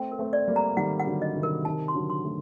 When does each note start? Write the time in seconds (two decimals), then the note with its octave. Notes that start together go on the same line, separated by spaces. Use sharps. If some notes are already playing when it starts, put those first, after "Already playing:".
Already playing: A3 C4 G5
0.12 A#4
0.19 A3 C4
0.33 D5
0.48 G3 A#3
0.56 A#5
0.77 D#3 G3 F#5
0.99 F#5
1.07 D3 F#3
1.22 D#5
1.36 C3 D#3
1.43 A#4
1.65 C3 D#3 A5
1.88 C6
1.94 D3 F#3
2.10 C6
2.24 F#3 A3